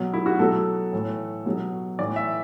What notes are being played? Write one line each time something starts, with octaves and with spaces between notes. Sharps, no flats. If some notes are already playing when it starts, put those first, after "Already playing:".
Already playing: B2 F#3
E4
F#4
B2 F#3 A4
A2 E3
B2 F#3
A2 E3 D5
E5